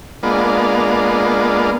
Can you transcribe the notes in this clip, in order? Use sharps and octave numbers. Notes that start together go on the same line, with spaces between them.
G#3 A#3 B3 D4 F4